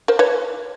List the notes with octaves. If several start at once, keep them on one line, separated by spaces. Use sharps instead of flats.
A#4 C5
B4 C#5